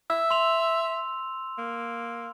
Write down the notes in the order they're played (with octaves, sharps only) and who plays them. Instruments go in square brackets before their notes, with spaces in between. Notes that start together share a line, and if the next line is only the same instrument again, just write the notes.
[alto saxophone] E5 [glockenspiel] E6
[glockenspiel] C6 F7
[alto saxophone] A#3